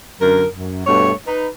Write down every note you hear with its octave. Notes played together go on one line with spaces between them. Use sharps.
F#2 D3 A#4
F#2
G2 B2 A3 C#5
D#4 B4